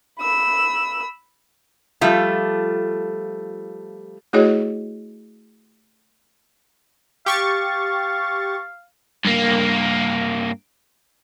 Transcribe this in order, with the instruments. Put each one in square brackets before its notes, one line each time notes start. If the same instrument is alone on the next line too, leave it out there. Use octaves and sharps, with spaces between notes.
[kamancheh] B5 E6
[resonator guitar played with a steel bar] F3 G3 A3 F4 E5
[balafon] A3 E4 F#4 G#4 C#5 D#5
[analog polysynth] G4 C#6 A6 [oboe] F5
[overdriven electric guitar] G2 A#3